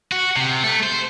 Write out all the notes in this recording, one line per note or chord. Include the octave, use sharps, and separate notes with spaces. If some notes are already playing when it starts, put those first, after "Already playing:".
F#4
C3
A3
C5